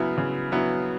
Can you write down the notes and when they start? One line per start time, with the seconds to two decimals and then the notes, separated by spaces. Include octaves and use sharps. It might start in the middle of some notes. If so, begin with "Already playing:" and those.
Already playing: C#3 F#3 B3 E4
0.18 C#3
0.52 F#3 B3 E4